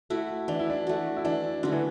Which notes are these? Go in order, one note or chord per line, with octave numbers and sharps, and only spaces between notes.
A3 E4 F#4
E3 D4
E4
D4
A3 F#4
E4
E3 D4
D3 A3 F#4
E3